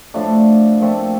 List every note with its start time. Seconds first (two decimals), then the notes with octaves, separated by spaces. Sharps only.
0.14 A2 F3 A3 D4
0.80 A#2 F3 A3 C4